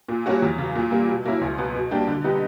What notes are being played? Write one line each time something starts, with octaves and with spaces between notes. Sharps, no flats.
A#2
G3 A#3 C#4 F#4
E2
C#3 F#3
A#2
G3 A#3
B2
F#3 A#3 C#4 E4
C#2
B2 F#3 B3
B2
G3 A#3 D4 G4
D3
G3 B3 D#4 G4